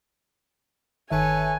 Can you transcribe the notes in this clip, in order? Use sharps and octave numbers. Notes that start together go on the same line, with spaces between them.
G1 D#3 A4 B4 C#5 E5 G#5